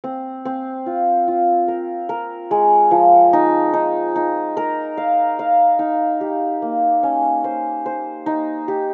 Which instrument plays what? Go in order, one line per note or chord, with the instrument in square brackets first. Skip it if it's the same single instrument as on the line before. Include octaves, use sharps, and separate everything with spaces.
[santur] C4
C4
F4
F4
A#4
A#4
G#3
F3
D#4
D#4
D#4
A#4
F5
F5
D#4
G4
A#3
C#4
C5
C5
D#4
G4